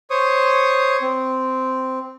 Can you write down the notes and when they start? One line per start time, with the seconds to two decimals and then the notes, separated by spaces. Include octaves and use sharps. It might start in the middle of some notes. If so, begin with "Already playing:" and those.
0.10 C5 C#5 C#6 D#6
1.02 C4